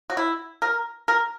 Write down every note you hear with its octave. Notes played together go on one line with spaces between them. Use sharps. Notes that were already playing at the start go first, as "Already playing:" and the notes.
F#4
E4
A#4
A#4